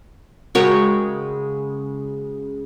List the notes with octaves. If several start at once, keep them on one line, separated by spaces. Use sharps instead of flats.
C#3 G#3 F#4 A#4 C#5 G5